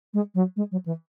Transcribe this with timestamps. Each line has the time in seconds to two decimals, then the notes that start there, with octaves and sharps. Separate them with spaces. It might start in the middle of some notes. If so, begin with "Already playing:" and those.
0.13 G#3
0.34 F#3
0.56 G#3
0.71 F#3
0.85 E3